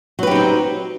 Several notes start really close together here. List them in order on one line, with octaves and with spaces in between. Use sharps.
F#3 B4 G4 D#4 C4